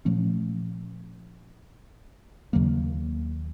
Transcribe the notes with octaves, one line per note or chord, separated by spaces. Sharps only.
A#2 F3 A3 C#4
D#2 C#3 F#3 A#3